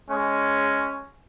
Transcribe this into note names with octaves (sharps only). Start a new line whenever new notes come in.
G#3 C#4